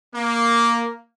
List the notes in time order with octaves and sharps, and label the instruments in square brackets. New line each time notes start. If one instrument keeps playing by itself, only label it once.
[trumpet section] A#3